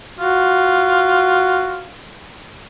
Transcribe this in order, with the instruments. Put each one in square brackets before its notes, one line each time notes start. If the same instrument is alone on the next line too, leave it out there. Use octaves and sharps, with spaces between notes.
[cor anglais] F4 [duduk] F#4